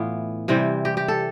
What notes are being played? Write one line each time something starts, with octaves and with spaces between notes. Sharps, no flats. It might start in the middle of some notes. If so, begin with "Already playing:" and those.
Already playing: A2 E3 B3 F4
C3 E3 G3 C4
G4
G4
A4